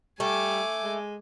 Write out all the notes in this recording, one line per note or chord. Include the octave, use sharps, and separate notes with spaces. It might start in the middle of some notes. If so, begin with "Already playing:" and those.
G3 A3 G#5 D6
G#3